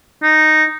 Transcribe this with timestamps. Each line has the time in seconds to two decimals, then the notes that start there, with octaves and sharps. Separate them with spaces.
0.23 D#4